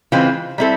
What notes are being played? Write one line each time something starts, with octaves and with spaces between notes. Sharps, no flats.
C#3 E3 G#3 C4 F4
G3 C4 E4 A4